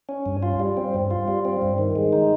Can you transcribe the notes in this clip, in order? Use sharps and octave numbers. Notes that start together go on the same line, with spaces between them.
C#4
G2
F4
G3
C4
G2
F4
G3
C4
G2
D#3
G#3
D#4